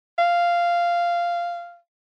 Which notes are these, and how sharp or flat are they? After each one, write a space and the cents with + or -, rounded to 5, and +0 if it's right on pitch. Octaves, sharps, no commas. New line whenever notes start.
F5 -10